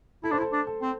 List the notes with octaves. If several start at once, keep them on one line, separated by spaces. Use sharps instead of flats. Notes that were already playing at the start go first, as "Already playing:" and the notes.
E4 A4
D4 C5
E4
A4
D4
A4
C4